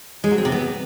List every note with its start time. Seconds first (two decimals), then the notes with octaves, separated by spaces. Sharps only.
0.24 G#3
0.31 F#3
0.38 C4
0.45 C3
0.52 B3